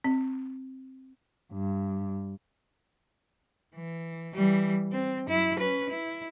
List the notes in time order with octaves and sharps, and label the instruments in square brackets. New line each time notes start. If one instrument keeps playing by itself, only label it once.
[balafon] C4
[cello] G2
E3
E3 G3
C4
F#2 E4
C#4 B4
E4